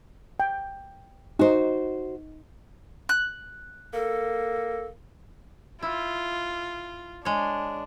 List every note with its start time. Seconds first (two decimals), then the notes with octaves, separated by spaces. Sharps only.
0.40 G5
1.39 D#4 F#4 C5
3.09 F#6
3.94 A#3 A4
5.82 E4 F4
7.25 G#3 D4 C#5